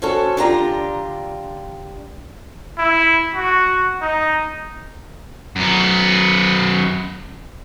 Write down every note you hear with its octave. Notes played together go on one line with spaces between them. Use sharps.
C4 C#4 F#4 A4
D3 D4 F4 G4 A5 A#5
E4
F#4
D#4
F#2 B3